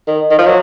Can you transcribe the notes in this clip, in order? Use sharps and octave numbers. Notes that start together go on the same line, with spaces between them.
D#3
D#3
F3
F#3